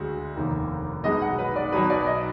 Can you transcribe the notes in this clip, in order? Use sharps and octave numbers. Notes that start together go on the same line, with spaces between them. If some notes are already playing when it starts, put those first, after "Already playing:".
Already playing: D2 D3 G#3 D4 F#4
F1 D#2 D#3
B1 B2 G#3 D#5
F#5
B4
D5
B1 B2 F#3 B4
D5
D#5